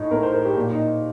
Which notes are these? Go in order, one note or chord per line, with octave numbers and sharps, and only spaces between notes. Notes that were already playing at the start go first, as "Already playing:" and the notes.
Already playing: A2 D#4
A2 A#4
C5
A#4
G4
A#2
D#4